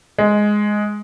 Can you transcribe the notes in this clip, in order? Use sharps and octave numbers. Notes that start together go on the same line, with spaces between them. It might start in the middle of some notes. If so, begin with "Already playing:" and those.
G#3